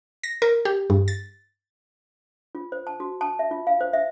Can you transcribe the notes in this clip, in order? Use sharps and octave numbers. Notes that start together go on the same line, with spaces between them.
A#6
A#4
G4
G2
A6
F4
C5
A5
F#4
A5
E5
F4
F5
C5
E5